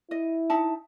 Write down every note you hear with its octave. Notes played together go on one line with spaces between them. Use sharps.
E4 D#5
D#4 E5 A5